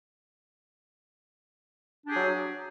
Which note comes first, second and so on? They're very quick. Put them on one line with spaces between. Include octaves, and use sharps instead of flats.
D4 G4 G#4 F#3